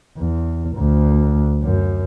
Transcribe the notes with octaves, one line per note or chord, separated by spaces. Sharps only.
E2
D2
F#2